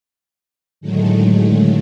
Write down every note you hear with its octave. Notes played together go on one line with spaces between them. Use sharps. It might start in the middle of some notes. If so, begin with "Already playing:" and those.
A2 D3 D#3 F#3 G#3 A3